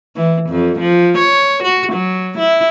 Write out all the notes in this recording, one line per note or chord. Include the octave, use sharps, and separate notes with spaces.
E3
F2
F3
C#5
F#4
F#3
E4